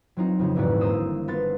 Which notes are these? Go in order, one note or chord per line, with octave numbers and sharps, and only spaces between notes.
F#3 C4 D#4 F4
F2 C#3 F4
D#1 E2 G#2 A3 F#4 D5
G1 A#3 C5 C6 D#6 E6
B3 F4 A6